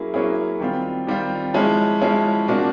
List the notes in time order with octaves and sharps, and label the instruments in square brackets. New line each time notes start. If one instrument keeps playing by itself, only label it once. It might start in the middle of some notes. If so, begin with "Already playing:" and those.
Already playing: [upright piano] F#3 A#3 C#4 E4 G#4
F#3 A#3 C#4 E4 G#4
D#3 G3 C4 F4
D#3 G3 C4 F4
F3 G#3 C#4 E4
F3 G#3 C#4 E4
C3 F3 A#3 D4 F#4